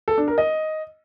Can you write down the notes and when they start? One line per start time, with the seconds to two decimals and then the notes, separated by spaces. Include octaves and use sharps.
0.08 A4
0.18 D4
0.28 A#4
0.38 D#5